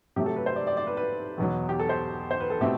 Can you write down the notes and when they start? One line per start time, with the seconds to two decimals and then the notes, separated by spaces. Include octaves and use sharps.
0.16 C3 F#3 A3 G4
0.26 A4
0.36 B4
0.46 C5
0.56 D5
0.67 D5
0.77 D5
0.87 B4
0.97 B4
1.38 E2 B2 F#3
1.69 G4
1.79 A4
1.89 C5
2.31 C5
2.40 B4
2.50 A4
2.61 B2 A3 C4 E4 G4